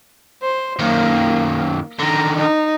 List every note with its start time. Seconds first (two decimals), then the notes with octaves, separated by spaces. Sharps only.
0.42 C5
0.79 F#2 D#3 A#3
1.99 D3 D#3 A#5
2.36 D#4